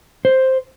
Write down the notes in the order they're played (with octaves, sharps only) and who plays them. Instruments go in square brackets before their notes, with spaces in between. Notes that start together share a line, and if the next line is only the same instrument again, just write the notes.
[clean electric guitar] C5